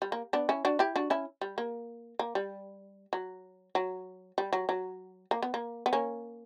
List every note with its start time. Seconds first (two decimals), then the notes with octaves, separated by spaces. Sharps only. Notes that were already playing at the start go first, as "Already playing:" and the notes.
0.02 G3
0.12 A#3
0.33 B3 D4
0.49 C#4 E4
0.65 D4 F#4
0.79 E4 G4
0.96 D4 F#4
1.10 C#4 E4
1.41 G3
1.58 A#3
2.19 A#3
2.35 G3
3.13 F#3
3.75 F#3
4.38 G3
4.53 F#3
4.69 F#3
5.31 A#3
5.43 B3
5.54 A#3
5.86 B3
5.93 A#3 C#4